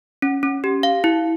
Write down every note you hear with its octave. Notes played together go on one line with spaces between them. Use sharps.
C#4
C#4
G4
F5
E4